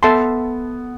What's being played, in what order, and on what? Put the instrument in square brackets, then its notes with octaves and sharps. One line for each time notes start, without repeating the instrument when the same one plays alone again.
[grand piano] B3 [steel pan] A4 E5 A5 C6